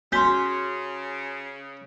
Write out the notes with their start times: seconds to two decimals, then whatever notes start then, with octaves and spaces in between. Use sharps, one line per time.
0.12 C#3 C#4 F#4 C6 G6 B6 G7